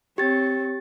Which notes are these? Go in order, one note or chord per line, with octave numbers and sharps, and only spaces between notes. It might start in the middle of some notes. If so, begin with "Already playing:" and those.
C4 G4 C#5 A6